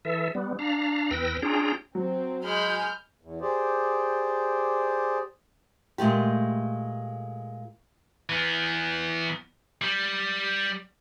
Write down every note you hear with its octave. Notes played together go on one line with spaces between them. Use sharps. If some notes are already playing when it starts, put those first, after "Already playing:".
E3 A4 E5
G3 B3
D4 F5 A#5
E2 B4 G5 E6 A#6
C#4 D4 F4 G#4 G5 A#5
F#3 C4
G#3 G#4 B5 F6 G6
E2
G4 G#4 C5 D5
A#2 G#3 A3 G4
E3 B3
G3